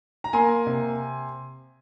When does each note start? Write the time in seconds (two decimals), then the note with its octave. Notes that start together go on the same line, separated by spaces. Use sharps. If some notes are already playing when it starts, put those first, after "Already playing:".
0.24 A#5
0.33 A#3 G#5 C6
0.66 C3